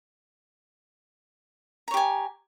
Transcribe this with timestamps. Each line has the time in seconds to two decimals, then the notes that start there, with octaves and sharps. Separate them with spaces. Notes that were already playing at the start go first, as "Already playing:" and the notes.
1.88 A#5
1.91 C#5
1.94 G4
1.97 G#5